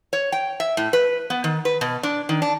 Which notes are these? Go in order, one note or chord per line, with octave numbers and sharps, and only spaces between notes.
C#5
G5
E5
A2
B4
B3
D#3
B4
B2
D4
D#3
D4